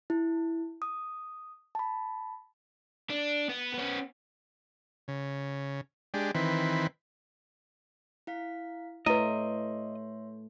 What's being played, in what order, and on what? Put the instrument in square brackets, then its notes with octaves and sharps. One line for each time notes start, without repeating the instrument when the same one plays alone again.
[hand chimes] E4
D#6
A5 B5
[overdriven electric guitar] D4
B3
B3 C#4
[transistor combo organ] C#3
G#3 D4 G4
D#3 E3 C4 B4
[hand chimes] E4 F5 B6
[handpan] A3 [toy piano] E4 B4 [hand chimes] C#5 E5 C6 [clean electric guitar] D#5